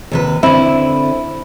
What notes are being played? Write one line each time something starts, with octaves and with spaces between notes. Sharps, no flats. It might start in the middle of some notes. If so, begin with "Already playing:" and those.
D#2 C3 B4
D3 C4 E4